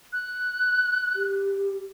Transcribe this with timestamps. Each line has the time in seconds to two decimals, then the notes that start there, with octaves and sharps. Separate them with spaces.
0.13 F#6
1.16 G4